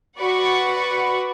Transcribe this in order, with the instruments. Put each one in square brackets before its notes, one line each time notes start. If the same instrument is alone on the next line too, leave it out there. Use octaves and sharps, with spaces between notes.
[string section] F#4 B4 D5 F#5 B5 C#6